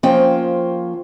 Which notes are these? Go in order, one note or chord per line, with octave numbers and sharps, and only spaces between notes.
F3 A#3 C#4 F4 C5 G5